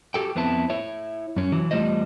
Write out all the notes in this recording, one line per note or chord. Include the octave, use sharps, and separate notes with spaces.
F#4 G4 A4 G5
F2 B3 C4 E4 A5
E4 C#5 E5
F#2 C#4
E3 F#3
E2 G3 A3 F4 C5 D#5